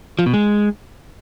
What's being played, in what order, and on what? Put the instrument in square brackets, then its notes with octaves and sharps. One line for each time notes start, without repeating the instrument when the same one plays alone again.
[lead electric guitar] F3
B2
G#3